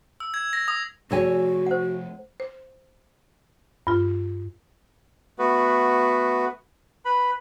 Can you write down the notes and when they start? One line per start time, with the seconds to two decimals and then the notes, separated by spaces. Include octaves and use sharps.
0.20 E6
0.34 G#6
0.53 A#6
0.68 D#6
1.11 C3 F3 A3 F#4 G#4 A4 C#5 G#5
1.66 C5 F#5
2.40 C5
3.87 G2 F4
5.39 A3 B3 F#4 B4
7.05 B4 B5